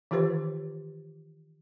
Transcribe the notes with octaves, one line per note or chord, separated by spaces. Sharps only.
D#3 E3 F4 G4 B4 C5